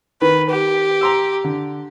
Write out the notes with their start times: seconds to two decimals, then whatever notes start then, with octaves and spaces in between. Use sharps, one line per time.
0.21 D#3 B4
0.50 G4
1.01 A#5 C6 E6
1.44 D3